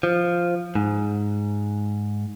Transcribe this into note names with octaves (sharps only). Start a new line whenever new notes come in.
F3
G#2